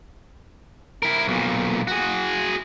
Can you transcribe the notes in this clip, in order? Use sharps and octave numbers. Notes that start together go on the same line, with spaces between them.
E4 A#4
B1 A#2
F#4 G#4